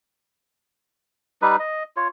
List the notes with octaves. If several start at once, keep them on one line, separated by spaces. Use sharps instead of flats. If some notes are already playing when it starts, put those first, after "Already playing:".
G3 D#4 B4
D#5
F4 C#5